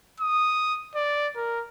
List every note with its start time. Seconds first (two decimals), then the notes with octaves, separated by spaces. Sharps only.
0.20 D#6
0.95 D5
1.36 A#4